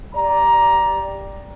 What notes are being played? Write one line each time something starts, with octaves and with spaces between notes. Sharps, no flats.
G4 D5 A#5